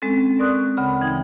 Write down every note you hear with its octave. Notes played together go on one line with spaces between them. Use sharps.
G#3 C4 C#4 A4
A#4 D5 C6 C#6 D#6 F#6
D2 C#3 B5
D2 E3 D#4 G5